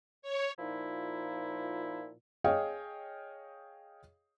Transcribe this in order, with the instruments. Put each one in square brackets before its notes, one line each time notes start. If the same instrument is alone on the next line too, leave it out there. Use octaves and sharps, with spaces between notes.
[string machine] C#5
[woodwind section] A#2 F3 D#4 E4
[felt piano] G#4 C#5 D#5 F5 G5